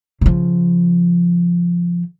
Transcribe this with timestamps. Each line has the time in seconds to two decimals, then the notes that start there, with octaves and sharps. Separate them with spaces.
0.21 C#3 F3